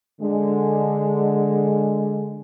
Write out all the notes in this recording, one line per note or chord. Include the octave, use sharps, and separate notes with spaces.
D3 G#3